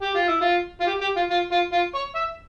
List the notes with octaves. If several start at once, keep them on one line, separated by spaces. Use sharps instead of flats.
G4
F4
E4
F4
F4
G4
G4
F4
F4
F4
F4
C#5
E5